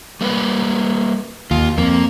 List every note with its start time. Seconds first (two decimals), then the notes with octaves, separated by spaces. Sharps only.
0.21 G3 A#3 B4
1.51 D#2 F4
1.78 F2 A#3